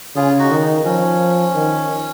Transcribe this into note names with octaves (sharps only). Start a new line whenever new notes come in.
C#3 F4 G#4
D#4 F#4
D#3
D#4
F3 C#4
D#3